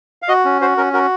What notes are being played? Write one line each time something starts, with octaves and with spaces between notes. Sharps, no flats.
F5
F#4 D#5
C#4
F#4 C5
C#4 A#4
F#4 A#4